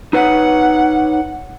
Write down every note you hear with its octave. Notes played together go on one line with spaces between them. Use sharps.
D#4 B4 C#5 F#5